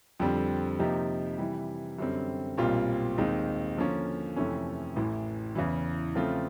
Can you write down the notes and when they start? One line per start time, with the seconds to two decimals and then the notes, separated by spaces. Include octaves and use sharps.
0.20 F2 D3 G3 C4
0.79 C3 F3 A#3 D#4 G4
1.38 C3 E3 G3
1.98 F#2 D3 G3 C4
2.58 B1 A#2 G3 C4 F4
3.18 D#2 D#3 G#3 C4 D#4
3.77 D3 F3 A#3 C#4
4.36 F2 C3 E3 A3 C#4
4.96 A1 A2 E3
5.55 E2 C#3 E3
6.15 C#3 F3 A3 C4 F4